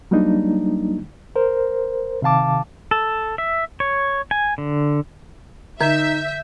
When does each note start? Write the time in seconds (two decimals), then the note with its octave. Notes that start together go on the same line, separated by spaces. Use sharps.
0.11 F#3 G3 A#3 D4 D#4
1.36 A#4 C5
2.22 C3 D#3 F5 A5 D6
2.91 A4
3.38 E5
3.80 C#5
4.31 G#5
4.58 D3
5.81 D3 D#4 E5 G6